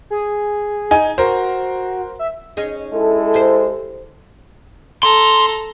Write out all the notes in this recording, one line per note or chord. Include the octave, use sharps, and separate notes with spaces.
G#4
D#4 G#5
F#4 A#4 C5
E5
C#4 D#4 G#4
G#3 E4 A4
G4 C5
A4 A#5 C6